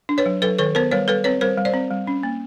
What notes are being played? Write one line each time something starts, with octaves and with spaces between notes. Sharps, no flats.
D4
B4 C#5
F#3
F#3 A4 B4
D#3 A4 B4
B3 A#4 C5
G3 B4 C#5
G3 A4 B4
C4 B4 C#5
G3 A#4 C5
G3
C5 D5
C4
G3
C#4
A#3